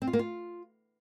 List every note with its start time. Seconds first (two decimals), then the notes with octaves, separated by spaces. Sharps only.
0.02 C4
0.07 F4
0.13 A#3
0.19 F4